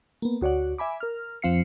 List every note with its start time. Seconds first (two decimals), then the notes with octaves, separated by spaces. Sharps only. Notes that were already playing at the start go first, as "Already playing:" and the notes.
0.22 A#3 B3
0.41 D2 F#4 C#5 D5 F#5
0.78 E5 G#5 B5 D6
1.00 A#4 F6
1.42 F2 F3 C4 F5 C7 C#7